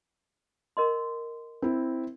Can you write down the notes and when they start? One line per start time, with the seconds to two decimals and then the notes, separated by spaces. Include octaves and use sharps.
0.77 A#4 D#5 C6
1.62 C4 E4